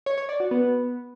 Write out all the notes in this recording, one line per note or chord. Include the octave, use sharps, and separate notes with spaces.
C#5
C#5
D5
F#4
B3